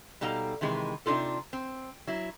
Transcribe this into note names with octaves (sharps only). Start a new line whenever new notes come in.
B2 G3 D#4 A4 F5 A#5
C3 D#3 E3 G#3
C3 D4 D#4 F4 A4
C4
F#3 E4